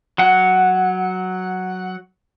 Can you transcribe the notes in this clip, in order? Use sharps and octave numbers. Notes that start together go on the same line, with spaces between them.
F#3 F#5